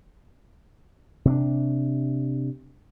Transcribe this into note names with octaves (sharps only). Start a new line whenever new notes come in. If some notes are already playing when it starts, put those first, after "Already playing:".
C3 C4 D4